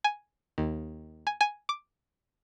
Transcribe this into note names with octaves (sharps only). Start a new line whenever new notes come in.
G#5
D#2
G#5
G#5
D6